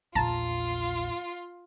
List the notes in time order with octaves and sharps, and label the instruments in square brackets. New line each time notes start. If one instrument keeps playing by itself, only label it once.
[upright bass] A#1 E2 [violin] F4 [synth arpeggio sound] A5 A#5